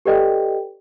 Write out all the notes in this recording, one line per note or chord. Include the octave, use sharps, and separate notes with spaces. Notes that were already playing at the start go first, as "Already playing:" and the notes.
G4 A4 B4 D5 D#5 G5